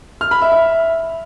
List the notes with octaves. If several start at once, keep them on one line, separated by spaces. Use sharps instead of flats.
F6
B5
E5
E5